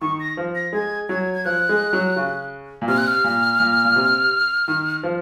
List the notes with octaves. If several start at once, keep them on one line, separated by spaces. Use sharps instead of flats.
D#3 C#6
A#6
F3
A#6
G#3 G#6
F#3 G#6
G#6
F3 F#6
G#3
F#3
C#3
A#2
C3 F6
F#6
F6
A#2
A#2
A#2
C3
D#3
F3